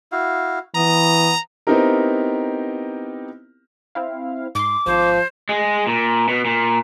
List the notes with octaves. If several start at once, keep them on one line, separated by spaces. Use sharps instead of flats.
E4 F#4 F5
E3 B3 A#5 D#6
B3 C4 D#4 E4 G4 A#4
C4 E4 F5
G#2 C6 D6
G#1 F3 C5
G#3
A#2
B2
A#2